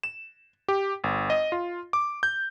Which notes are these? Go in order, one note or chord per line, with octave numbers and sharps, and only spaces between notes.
E7
G4
G1
D#5
F4
D6
G6